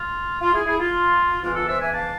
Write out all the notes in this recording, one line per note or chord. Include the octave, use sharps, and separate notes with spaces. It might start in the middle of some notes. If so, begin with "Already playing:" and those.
Already playing: F4
F4
E4 G#4
E4 G#4
F4
G#2 E3 B3 D4 F4
F4 A4
C5 E5
E5 G#5
F5 A5